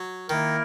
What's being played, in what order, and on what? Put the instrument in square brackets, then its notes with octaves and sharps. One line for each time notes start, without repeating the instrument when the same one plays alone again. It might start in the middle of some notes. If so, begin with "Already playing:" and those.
Already playing: [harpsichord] F#3
[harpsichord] D#3 [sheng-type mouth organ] A#3 E4 A#4